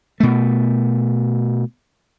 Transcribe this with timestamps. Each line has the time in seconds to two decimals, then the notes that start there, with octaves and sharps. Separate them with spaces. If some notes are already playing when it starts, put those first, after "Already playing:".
0.20 B2 A3